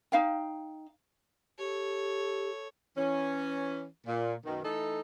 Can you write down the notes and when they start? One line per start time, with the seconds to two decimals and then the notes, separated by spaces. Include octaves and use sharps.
0.12 D#4 F5 G5
1.59 G4 A4 C#5
2.96 E3 C#4
4.06 A#2
4.45 F#2 B2 D#3
4.64 E3 A3 D#4 A4